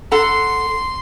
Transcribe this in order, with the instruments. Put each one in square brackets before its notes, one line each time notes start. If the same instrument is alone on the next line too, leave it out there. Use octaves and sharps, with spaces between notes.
[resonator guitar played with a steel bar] A4 F#5 A#5 [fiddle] C6